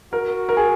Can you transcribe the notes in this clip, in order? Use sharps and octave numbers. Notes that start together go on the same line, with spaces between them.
F#4 A#4
A#4
G#4